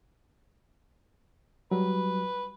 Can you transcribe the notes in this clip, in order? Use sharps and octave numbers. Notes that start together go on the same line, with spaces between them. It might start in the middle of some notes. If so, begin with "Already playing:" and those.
F#3 G3 B4